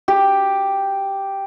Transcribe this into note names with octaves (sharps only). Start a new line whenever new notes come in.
G4